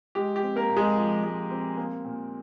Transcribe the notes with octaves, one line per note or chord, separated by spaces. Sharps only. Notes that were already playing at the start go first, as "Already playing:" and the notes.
G#3 G4
G4
C4
A#3 A#4
A#2
G#3 G#4
F3
G#3
C4
A#3
A#2